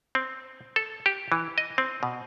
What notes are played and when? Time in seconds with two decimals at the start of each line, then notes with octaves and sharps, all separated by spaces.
0.15 C4
0.76 A4
1.06 G4
1.32 E3
1.58 D#5
1.78 C4
2.03 B2